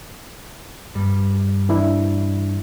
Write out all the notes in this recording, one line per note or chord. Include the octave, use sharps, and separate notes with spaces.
G2 G3
E3 D4 E4